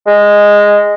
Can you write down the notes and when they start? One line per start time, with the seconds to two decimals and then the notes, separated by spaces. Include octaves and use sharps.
0.06 G#3